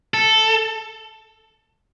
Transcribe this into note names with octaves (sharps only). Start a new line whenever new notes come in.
A4